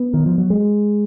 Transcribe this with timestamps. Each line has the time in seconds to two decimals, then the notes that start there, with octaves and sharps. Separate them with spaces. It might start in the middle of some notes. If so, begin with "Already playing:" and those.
Already playing: B3
0.14 D#3
0.26 F3
0.38 F#3
0.50 G#3